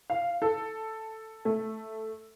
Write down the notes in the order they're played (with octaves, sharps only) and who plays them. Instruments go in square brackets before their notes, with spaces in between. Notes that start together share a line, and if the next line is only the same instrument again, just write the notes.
[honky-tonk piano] F5
A4
A3